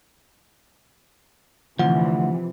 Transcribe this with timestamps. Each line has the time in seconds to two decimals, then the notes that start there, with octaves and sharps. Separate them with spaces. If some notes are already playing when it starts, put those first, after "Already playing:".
1.79 D2 C3 E3 F3 F#5